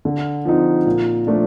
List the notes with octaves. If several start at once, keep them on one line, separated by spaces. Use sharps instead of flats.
D3
F3 C4 D#4
A#2
F3 A3 D4